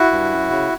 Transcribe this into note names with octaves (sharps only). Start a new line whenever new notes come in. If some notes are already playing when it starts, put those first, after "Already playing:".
Already playing: E4 F#4
G2
F#2
C#3